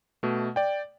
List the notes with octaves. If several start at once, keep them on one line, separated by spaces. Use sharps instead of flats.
B2 A3
D5 G5